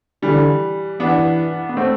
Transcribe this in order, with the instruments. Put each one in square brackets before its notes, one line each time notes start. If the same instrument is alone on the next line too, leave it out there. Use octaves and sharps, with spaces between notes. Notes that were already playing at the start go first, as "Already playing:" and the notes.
[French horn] D3 [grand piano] E3 G3
[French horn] E3 [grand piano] B3 D4
[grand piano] B3
A3 C4